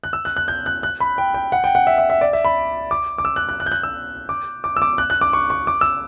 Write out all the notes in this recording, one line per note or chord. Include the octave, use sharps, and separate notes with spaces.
F#6
E6
F#6
F#6
G6
F#6
F#6
B5
G5
G5
F#5
G5
F#5
E5
E5
E5
D5
E5
B5
D6
D6
E6
F#6
F#6
F#6
G6
F#6
E6
D6
D6
E6
D6
F#6
F#6
D6
C#6
C#6
D6
E6